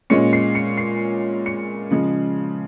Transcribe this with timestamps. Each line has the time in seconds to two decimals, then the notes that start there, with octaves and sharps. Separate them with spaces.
0.10 A#2 G#3 C#4 C#7
0.33 C7
0.55 C#7
0.78 C7
1.46 C#7
1.91 C#3 F3 G#3